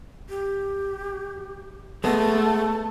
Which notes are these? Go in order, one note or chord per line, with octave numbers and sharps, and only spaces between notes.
G4
G#3 A3 B3 A5